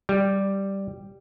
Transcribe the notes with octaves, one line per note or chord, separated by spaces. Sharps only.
G3